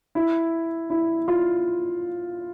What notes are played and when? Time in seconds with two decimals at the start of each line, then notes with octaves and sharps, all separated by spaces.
0.15 E4
0.90 E4
1.28 F4